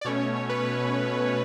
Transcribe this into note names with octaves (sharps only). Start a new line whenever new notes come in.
D5
B2 A3 C#4 C#5
B4